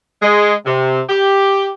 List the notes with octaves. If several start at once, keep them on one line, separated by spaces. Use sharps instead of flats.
G#3
C3
G4